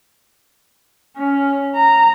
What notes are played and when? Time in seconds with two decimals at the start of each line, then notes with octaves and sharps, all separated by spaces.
1.17 C#4
1.76 A#5